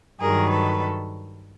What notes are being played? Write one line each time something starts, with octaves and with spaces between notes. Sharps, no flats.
G2 D#3 F#3 G#4 A#4
A4 B4